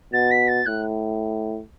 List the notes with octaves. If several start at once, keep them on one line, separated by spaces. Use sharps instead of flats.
B2 A6
B6
A6
A2 F#6